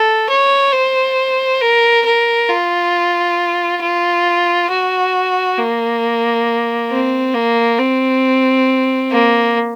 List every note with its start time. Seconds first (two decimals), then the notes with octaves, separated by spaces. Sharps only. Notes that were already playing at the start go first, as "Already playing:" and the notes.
Already playing: A4
0.29 C#5
0.73 C5
1.60 A#4
2.05 A#4
2.49 F4
3.82 F4
4.70 F#4
5.58 A#3
6.91 C4
7.34 A#3
7.79 C4
9.11 A#3